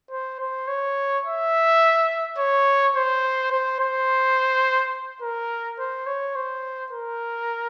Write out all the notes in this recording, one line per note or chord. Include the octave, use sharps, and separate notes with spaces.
C5
C5
C#5
E5
C#5
C5
C5
C5
A#4
C5
C#5
C5
A#4